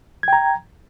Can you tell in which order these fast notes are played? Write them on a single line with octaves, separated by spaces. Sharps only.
G#6 G5 A#5